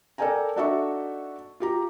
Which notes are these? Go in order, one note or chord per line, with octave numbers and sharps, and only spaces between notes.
A4 A#4 D5 G5 G#5 A#5
D4 D#4 F#4 A4 E5 C#6
F4 G4 A#5